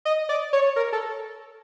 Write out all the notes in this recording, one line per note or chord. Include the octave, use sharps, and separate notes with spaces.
D#5
D5
C#5
A#4
A4